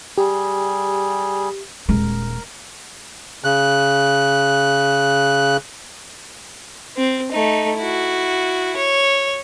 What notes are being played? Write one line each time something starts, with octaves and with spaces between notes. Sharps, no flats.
G3 G4 G#4
D#1 G#3 A#4
C#3 F#6
C4
A3 D#4
E4 F#4
C#5